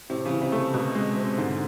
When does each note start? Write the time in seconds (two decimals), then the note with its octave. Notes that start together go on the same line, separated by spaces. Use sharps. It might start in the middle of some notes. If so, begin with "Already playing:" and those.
0.10 A2 C3
0.25 C#3
0.31 E3
0.42 C3
0.52 A3
0.74 B2
0.95 G#3
1.16 C4
1.38 G#2 D3